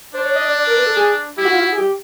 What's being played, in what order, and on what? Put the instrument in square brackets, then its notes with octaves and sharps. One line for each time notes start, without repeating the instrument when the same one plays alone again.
[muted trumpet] D4 [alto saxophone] C5
[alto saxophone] C#5
D#5
D5
D5
A#4
B4
A4
G#4
[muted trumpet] E4 [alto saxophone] G4
[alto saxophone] F#4
F4
F#4
G#4
G4